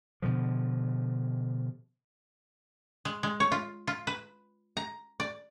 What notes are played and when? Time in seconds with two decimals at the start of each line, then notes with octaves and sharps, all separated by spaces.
0.22 B2 D3 F3
3.05 G#3
3.23 G#3
3.40 C#5
3.52 F4
3.87 F4
4.07 B4
4.77 A#5
5.20 D5